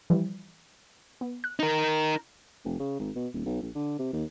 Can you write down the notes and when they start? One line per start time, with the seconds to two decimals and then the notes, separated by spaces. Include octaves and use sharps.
0.10 E3 F3 G3
1.21 B3
1.44 F#6
1.59 D#4 A#4
2.65 F1
2.80 C#3
2.99 G#1
3.16 B2
3.34 D#1
3.46 B1
3.62 A#1
3.75 D3
3.99 C3
4.13 D#2